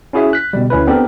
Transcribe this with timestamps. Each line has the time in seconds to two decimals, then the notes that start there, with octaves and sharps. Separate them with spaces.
0.13 C#4 E4 F#4 G#4 C#5 E5
0.33 F#6 B6
0.53 B2 D3 G3
0.70 D2 C#4 E4 B4
0.87 B3 C4 D4 G4 A4 A#4